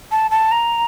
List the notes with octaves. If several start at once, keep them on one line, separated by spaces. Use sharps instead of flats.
A5
A5
A#5